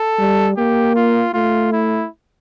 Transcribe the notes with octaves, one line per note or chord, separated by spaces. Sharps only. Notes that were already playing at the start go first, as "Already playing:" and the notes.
Already playing: A4
G3
A#3 G4
F4
A3 F4
E4